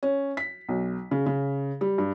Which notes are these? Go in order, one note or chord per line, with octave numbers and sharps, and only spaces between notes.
C#4
B6
B1
C#3
C#3
G3
G2